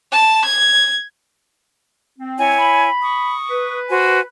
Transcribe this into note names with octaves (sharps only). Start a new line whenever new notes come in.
A5
G#6
C4
E4 C#5 G#5
B5
C#6 D#6
B4
F#4 C5 G#5